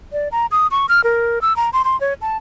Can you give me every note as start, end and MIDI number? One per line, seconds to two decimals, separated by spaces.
0.12 0.29 74
0.32 0.46 82
0.51 0.67 87
0.71 0.86 85
0.89 1.04 89
1.04 1.41 70
1.42 1.56 88
1.56 1.70 82
1.73 1.82 84
1.85 1.99 84
2.01 2.14 73
2.21 2.37 81